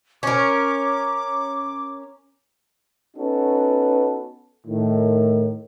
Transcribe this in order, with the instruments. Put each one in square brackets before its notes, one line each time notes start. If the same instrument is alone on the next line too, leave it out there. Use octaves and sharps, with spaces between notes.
[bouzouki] C#4 A#4 [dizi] D6
[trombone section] B3 C#4 D#4 F#4 A4 B4
A2 D#3